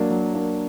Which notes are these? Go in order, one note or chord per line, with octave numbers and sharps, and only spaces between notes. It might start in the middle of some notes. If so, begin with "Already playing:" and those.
Already playing: F#3 A#3 D4
F#3
A#3 D4